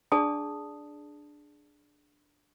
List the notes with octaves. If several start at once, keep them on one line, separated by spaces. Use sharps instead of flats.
D4 G#4 D5 A5 D#6